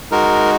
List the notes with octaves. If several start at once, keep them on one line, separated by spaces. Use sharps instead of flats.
G#3 D#4 F#4 A#4